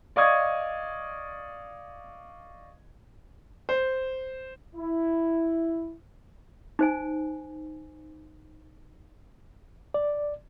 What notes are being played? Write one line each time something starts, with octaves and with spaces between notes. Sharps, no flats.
D5 D#5 F5 C#6 D#6 G#6
C5
E4
D#4 C5 G#5
D5